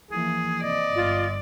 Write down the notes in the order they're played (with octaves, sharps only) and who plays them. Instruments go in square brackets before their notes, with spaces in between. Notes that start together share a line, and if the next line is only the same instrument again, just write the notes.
[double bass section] E3 F3 A#3 [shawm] G#4
[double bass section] C3 [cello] D5 [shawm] D#5
[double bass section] G1 [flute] F4